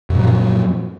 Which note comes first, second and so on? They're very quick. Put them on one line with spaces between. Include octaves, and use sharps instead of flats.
F#2 A#2 F#3 F3